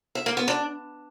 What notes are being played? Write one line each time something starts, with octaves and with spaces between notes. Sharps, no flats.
E5
A#3
B3
D4